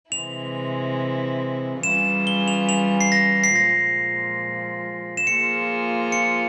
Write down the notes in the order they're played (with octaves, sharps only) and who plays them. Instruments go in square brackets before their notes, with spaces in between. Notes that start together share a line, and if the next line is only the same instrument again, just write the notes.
[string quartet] C3 E3 G#3 C4 E4 [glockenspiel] F7
[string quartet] E3 G3 C#4 F4 G#4 [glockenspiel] E7
[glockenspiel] G7
F7
F7
C7
A#6
C7
[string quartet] A#2 F3 G#3 [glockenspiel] A#6
[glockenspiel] E7
[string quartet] F3 A#3 F4 G#4 [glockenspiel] C#7
[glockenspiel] C#7